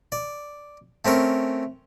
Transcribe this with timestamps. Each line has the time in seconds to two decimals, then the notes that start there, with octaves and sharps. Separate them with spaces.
0.12 D5
1.05 A3 C4 C#4 A#4